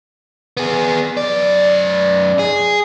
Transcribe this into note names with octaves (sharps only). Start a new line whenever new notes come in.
B3 G#4
F#2 D5
G#4